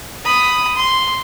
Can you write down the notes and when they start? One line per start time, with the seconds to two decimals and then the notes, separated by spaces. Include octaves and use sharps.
0.24 B5 D#6
0.76 C6